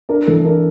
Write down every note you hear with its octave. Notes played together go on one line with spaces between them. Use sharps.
D4 A#4
E3 A4
D4 A#4